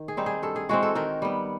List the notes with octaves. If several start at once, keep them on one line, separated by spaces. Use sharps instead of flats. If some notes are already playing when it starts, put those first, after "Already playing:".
Already playing: D#3
G#4
G3 C4 D#4
G#4
G2 A4
G#4
E3 G#3 C4 F#4
A4
D#3 A#4
G3 B3